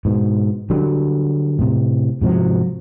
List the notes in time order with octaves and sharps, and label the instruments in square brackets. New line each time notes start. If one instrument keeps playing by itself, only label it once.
[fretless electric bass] G#2 B2
D3 F#3 G3
A2 C3
G#2 C3 F3 F#3